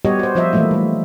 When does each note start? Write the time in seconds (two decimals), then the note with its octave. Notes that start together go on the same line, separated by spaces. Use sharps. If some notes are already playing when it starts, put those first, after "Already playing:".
0.05 G3 B3 F#4 G4 C#5 D#5
0.19 F#4 C5
0.35 F3 F4 C5 D#5 E5
0.53 D#3 E3 F#3 A3 A#3 E4
0.71 G3 A3